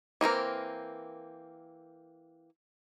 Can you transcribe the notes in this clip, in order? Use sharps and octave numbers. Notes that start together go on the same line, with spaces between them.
E3 A#3 C4 A#4